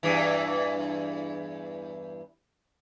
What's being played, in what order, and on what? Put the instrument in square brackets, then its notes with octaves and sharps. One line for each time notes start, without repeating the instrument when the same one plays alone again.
[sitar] E2 G2 E3